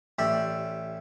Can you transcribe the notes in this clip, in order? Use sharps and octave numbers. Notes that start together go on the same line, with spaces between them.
A1 G4 D5 E5